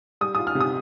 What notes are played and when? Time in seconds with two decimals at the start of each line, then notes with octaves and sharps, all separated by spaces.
0.21 G3 D#6
0.35 F4 D#6
0.47 F6
0.55 C3
0.60 D#6